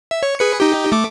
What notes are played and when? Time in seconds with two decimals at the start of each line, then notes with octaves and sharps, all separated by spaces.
0.11 E5
0.23 C#5
0.39 G#4 B4 C#7
0.60 D#4 G4
0.92 A3 D6